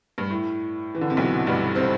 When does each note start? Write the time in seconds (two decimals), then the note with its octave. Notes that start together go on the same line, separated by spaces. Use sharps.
0.18 G2
0.30 A2
0.95 E3
1.01 D3
1.10 C3
1.17 B1 B2
1.47 G2 G3
1.75 C3 C4